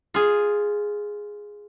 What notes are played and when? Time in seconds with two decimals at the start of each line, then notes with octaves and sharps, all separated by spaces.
0.14 F4 G#4